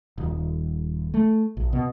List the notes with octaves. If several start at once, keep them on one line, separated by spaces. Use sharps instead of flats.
D#1
A3
A#1
B2